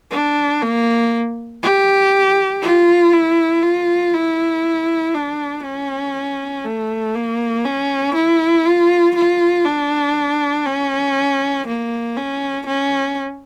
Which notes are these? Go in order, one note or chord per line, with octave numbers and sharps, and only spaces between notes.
D4
A#3
G4
F4
E4
F4
E4
D4
C#4
A3
A#3
C#4
E4
F4
F4
D4
C#4
A#3
C#4
C#4